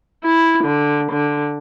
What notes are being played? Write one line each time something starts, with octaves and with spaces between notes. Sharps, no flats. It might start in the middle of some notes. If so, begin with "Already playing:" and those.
E4
D3
D3